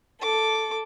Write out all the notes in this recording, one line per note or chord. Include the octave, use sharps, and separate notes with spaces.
A4 D6